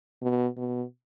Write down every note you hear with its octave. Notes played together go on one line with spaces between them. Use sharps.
B2
B2